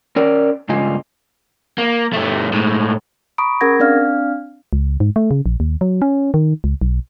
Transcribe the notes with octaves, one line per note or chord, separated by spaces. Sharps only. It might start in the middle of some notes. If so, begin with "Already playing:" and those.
C#4 A#4 D5
G2 C#3 G#3 F4 D#5 G#5
A#3
G2 A3
A2 G#3
A#5 B5 C#6 D#6 D7
C#4 G#4 A#4 F#5 G#6 A#6
C4 D4 D5 F5 F6
C#2
G#2
A3
C#3
A#1
D#2
F#3
C#4
D#3
C#2
B1